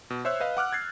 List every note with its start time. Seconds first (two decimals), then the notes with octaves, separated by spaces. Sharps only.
0.10 B2
0.25 C5 C#5 E5 E6 F#6
0.40 B4 D#5 F5
0.57 F#5 D6 F6 F#6
0.72 G#6 A6 C7